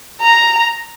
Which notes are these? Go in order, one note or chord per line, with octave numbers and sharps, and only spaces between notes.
A#5